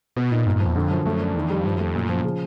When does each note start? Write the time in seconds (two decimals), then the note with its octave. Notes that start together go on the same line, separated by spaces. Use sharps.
0.16 B2 B3
0.31 A#2 D#4
0.46 G2 A#2
0.56 G2
0.60 F3
0.66 E2
0.76 F2 D3
0.90 F#2 F3
1.05 F#2 A3
1.20 D4
1.35 E2 D#3
1.50 F2 G3
1.65 G2 F3
1.75 F#2 A3
1.85 F2
1.95 F#2 A#2
2.09 F3
2.24 C#3